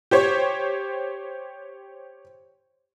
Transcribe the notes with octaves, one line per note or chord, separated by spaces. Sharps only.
G4 C5 C#5